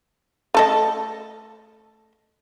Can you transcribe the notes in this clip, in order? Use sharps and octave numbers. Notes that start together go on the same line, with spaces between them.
A3 A4 D#5